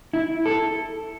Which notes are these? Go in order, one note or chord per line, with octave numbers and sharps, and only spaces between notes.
E4
A4